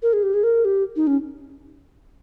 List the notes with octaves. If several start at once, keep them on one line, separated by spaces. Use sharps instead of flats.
A#4
G#4
G4
G#4
A#4
G4
D#4
C#4